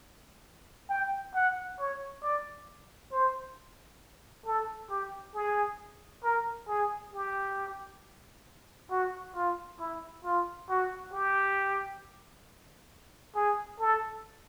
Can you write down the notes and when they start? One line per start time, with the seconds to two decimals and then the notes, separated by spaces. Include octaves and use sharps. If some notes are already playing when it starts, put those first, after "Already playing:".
0.90 G5
1.35 F#5
1.79 C#5
2.23 D5
3.12 C5
4.46 A4
4.90 G4
5.34 G#4
6.24 A#4
6.68 G#4
7.13 G4
8.90 F#4
9.35 F4
9.79 E4
10.25 F4
10.69 F#4
11.12 G4
13.35 G#4
13.80 A4